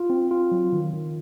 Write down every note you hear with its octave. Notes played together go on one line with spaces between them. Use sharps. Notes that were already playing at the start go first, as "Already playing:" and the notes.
Already playing: F4
C4
F4
F#3
D#3
D#3